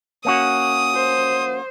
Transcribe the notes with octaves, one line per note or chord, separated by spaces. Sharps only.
A#3 C#4 F#4 D#6
C5